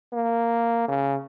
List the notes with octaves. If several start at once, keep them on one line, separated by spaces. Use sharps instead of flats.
A#3
C#3